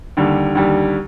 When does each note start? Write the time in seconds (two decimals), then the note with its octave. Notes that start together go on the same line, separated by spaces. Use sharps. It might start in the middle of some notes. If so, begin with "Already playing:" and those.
0.17 D#2 D3 G3
0.55 D#2 D3 G3